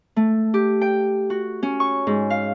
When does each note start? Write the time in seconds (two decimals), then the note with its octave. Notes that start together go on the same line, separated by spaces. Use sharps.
0.16 A3
0.54 G4
0.82 G5
1.30 F#4
1.63 C#4
1.80 C#6
2.07 G#2
2.30 F5